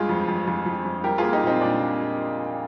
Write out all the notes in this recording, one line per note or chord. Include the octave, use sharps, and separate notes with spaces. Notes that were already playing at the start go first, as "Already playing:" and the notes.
Already playing: G2 G#3 F4 G#4
F2
F2
F2
F2
F2
G3 G4 A#4
A#3 F4 G#4
D#4 G4
A#2 C4 D#4
A#2 D4
A#2